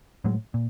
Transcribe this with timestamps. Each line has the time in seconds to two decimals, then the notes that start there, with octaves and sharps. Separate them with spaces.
0.25 A2 F#3 G#3
0.54 A#2